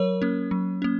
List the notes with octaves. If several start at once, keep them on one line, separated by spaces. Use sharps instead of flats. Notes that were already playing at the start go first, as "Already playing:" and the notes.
Already playing: F#3 A#4 C#5
A#3 C#4
F#3
A#3 C#4